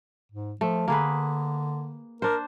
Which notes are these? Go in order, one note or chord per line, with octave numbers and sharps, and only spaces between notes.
G#2
F3 A3
D3 A#3 G#4 B4
D4 A#4 C5